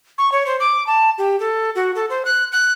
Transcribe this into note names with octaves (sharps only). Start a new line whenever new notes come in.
C#6
C#5
C5
D6
A5
G4
A4
F#4
A4
C5
F#6
F#6